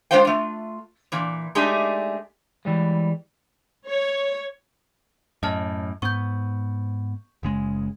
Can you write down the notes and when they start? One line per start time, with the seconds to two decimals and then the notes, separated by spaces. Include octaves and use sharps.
0.11 G#3 D4 F4 C5 F5 G5
0.25 A3 F4
1.12 A#2 E3
1.55 G#3 A3 D4 D#4 G4 G#4
2.65 E3 G3 G#3
3.88 C#5
5.43 F#2 A2 D#5 A5 F6
6.02 G#2 B3 C#6 G6
7.43 F#1 C#3 G#3